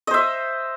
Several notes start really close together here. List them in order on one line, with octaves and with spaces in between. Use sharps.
D#5 C5 E5